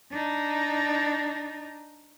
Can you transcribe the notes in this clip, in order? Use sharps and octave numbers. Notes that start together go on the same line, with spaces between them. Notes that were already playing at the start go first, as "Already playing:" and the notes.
D4 D#4